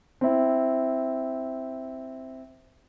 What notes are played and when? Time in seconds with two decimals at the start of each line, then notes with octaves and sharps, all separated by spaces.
0.21 C4 E4